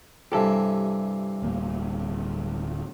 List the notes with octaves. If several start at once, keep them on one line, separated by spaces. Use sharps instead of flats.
G2 C3 E3 G4 A4
D1 A#3